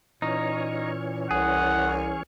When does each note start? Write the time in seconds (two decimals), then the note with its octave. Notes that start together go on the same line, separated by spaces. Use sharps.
0.22 A#2 E3 C#4 D#4 C#5
1.31 C2 G#4 F#5